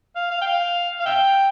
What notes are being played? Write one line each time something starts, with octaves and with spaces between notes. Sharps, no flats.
F5
F5
G5
F5
F5
E5 G5